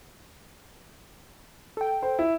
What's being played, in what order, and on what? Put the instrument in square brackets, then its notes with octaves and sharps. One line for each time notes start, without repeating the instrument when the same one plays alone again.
[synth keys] A4 G5
[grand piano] C5
E4